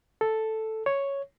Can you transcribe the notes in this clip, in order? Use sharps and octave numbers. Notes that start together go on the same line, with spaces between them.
A4
C#5